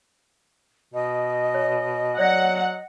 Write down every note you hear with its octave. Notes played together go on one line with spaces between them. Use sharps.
B2 D#5
C#5
F#3 C#5 D5 F#5 A#6